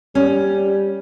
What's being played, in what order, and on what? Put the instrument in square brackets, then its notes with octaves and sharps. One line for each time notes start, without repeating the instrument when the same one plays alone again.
[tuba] G3 [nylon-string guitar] C#4